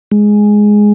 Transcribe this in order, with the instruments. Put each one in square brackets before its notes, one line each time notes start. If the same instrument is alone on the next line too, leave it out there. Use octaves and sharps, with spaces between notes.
[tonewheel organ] G#3